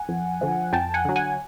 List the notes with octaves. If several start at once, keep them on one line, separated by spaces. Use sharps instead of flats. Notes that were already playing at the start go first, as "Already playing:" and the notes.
Already playing: F#5 G#5
F2
D3 F3
F2 G5 A5
F#5 G#5
D3 F#3
F#5 G#5